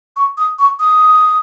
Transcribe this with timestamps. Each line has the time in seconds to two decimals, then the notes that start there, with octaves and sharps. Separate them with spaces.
0.16 C#6
0.38 D#6
0.59 C#6
0.80 D#6